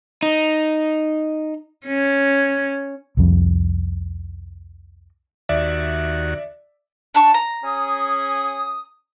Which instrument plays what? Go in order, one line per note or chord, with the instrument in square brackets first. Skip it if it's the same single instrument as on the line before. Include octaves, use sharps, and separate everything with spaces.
[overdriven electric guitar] D#4
[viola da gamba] C#4
[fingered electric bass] C2 F2
[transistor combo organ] D#2 F#4 [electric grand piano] D5 E5
[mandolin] D4 A5 C#6
A#5
[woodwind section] C#4 G#4 D#6